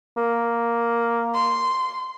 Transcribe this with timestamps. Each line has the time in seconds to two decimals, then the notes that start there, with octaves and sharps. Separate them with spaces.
0.17 A#3
1.34 C6